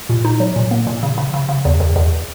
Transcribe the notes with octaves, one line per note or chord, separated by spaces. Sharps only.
A#2
D#4
F#3
A#2
A#3
A#2
C#3
C#3
C#3
C#3
E2
E2
E2